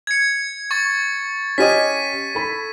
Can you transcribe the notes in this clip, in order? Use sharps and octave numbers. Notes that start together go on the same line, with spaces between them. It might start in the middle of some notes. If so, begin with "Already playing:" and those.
G#6 C#7
C#6 A6
C#4 G4 D#5 B6 D#7
A4 B5